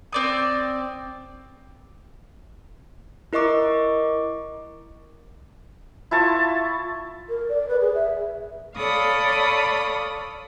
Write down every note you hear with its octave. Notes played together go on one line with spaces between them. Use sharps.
C4 D5 D#6
E4 A#4 D#5 C#6 D6
E4 F4 A5 C#6
A#4
D5
B4
G#4
E5
A4 C#5 D5 F5 B5 D#6